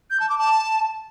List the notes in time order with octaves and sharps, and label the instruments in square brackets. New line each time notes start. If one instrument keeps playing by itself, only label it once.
[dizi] G6
A5
D6
A5